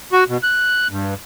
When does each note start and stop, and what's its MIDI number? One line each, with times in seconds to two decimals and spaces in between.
0.12 0.24 66
0.29 0.37 47
0.43 0.88 90
0.90 1.14 43